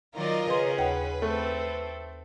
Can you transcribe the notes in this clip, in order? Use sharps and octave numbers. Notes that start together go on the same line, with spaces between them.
D#3 F#3 F4 A#4 D5 D#5
C#3 C#4 G#4 B4 C6
D#2 B4 F#5 G5
A3 C4 A4